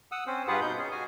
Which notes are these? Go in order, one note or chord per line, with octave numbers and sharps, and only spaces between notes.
F#5 D#6 E6
C4 C#4 C5
G2 F4 G4 G#4 B4 F#5
B2 D#4 G6
C#4 G#4
F#4 G#4 G#5